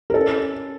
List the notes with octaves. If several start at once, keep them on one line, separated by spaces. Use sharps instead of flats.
A#4
C#4 A4